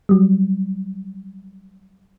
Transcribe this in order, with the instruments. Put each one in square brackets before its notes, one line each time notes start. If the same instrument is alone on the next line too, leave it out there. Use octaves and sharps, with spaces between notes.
[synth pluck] F#3 G3